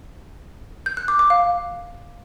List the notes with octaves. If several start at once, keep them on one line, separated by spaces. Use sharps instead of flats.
G6
F#6
D6
D6
F5